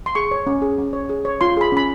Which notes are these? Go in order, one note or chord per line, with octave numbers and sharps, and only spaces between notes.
C6
G#4 C#6
C#5
C#4
G#4
C#4
C#5
G#4
C#5
F4 C6
G#4 B5
C#4 B5